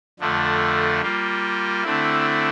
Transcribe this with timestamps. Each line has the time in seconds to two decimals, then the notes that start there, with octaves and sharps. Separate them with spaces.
0.19 F2 D3 F3 A3
1.01 G3 A#3 F4
1.83 D3 A3 C4 E4